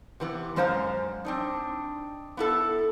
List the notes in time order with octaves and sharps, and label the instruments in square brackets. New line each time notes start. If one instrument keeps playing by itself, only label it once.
[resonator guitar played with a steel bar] C3 E3 B3
F#2 G#3 C#4 C5 F5 A#5
C4 D4 D#4
B3 E4 A4